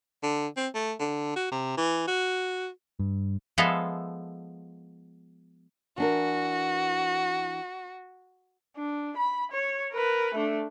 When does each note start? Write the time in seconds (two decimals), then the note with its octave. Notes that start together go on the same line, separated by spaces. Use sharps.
0.23 D3
0.57 C4
0.75 A3
0.99 D3
1.36 F#4
1.51 C3
1.78 E3
2.08 F#4
2.99 G2
3.58 F3 G#3 B3 F4 A4 E5
5.98 E3 D4 F#4 A#4
8.76 D4
9.17 B5
9.52 C#5
9.92 A#4 B4
10.34 A3 D4